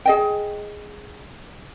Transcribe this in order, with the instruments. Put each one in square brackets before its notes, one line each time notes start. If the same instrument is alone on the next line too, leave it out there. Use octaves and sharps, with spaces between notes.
[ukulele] G#4 D#5 G5